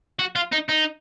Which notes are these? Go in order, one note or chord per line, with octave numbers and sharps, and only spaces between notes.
F#4
F4
D#4
D#4